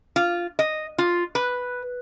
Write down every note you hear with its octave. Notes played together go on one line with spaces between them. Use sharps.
F4
D#5
F4
B4